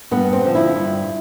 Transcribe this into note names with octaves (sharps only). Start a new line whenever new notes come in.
G2 B3
C4
D3 F3
E4
G2